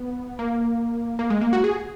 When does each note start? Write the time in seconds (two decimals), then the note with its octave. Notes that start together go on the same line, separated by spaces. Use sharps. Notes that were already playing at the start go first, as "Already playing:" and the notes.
Already playing: B3
0.39 A#3
1.19 A#3
1.30 G#3
1.41 A#3
1.53 F#4
1.64 G#4